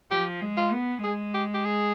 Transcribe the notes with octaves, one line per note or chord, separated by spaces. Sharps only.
F3 G4
G#3
F4
B3
G#3 G#4
G4
G4
G#4